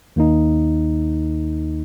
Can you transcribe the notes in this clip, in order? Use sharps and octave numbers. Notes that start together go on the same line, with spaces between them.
D#2 D#3 A#3 D#4